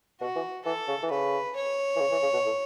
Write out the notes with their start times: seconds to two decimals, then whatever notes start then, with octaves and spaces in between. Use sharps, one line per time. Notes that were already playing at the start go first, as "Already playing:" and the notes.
0.21 B2 F#4
0.36 E3
0.65 E3 A4
0.88 C#3
1.03 E3
1.11 C#3 B4
1.56 C#5
1.96 E3
2.00 C#3
2.12 E3
2.22 C#3
2.33 B2
2.45 A2